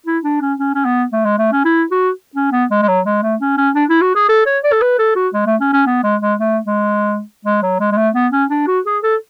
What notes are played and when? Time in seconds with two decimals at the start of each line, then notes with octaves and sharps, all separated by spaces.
0.06 E4
0.24 D4
0.41 C#4
0.59 C#4
0.75 C#4
0.85 B3
1.13 A3
1.25 G#3
1.38 A3
1.52 C#4
1.65 E4
1.91 F#4
2.35 C#4
2.52 B3
2.71 G#3
2.82 G#3
2.88 F#3
3.06 G#3
3.23 A3
3.41 C#4
3.58 C#4
3.75 D4
3.89 E4
4.01 F#4
4.15 G#4
4.29 A4
4.46 C#5
4.64 D5
4.72 A4
4.82 B4
4.99 A4
5.16 F#4
5.34 G#3
5.46 A3
5.60 C#4
5.73 C#4
5.86 B3
6.04 G#3
6.22 G#3
6.40 A3
6.66 G#3
7.45 G#3
7.62 F#3
7.80 G#3
7.92 G#3
7.97 A3
8.14 B3
8.32 C#4
8.50 D4
8.67 F#4
8.86 G#4
9.03 A4